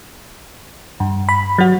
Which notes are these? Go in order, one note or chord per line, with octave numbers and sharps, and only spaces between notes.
G2
B5
F#3 F#4